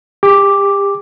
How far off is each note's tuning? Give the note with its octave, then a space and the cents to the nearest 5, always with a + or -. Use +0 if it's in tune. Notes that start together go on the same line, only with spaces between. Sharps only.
G4 +35 D6 +0